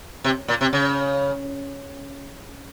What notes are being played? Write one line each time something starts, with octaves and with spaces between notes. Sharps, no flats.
C3
A#2
C3
C#3